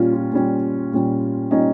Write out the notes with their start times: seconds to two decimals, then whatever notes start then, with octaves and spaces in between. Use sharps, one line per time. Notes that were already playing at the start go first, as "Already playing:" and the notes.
Already playing: A#2 G3 C#4 F4
0.13 F4
0.32 A#2 G3 C#4
0.92 A#2 G3 C#4
1.51 A#2 G3 C#4 D#4